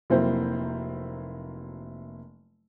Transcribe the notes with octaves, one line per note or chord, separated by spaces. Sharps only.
F1 F#3 A#3 C4 E4 C5